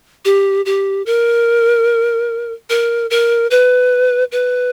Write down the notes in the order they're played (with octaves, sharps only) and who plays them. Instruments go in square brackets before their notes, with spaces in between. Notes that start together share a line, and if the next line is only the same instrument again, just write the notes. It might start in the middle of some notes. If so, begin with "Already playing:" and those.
[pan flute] G4
G4
A#4
A#4
A#4
B4
B4